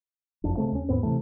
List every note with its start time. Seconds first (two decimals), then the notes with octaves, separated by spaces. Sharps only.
0.44 F#1 F2 D4
0.57 C#3 G#3 A3 C4
0.72 D#2 C#4
0.89 D#2 G#2 B3 C4
1.03 C3 E3 A3